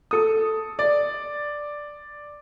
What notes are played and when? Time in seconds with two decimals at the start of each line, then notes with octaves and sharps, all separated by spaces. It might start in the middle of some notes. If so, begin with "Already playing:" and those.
0.11 A4 D#6
0.79 D5